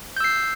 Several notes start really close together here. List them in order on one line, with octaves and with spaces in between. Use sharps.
G6 E6 C7